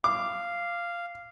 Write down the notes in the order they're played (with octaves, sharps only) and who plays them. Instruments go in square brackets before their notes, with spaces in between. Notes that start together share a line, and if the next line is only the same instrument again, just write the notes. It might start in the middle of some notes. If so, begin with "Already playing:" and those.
[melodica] F5 [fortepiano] D6